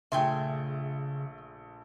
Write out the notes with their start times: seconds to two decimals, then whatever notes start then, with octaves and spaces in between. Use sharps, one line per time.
0.12 A#1 C#3 A3 E5 G5 G#5 C6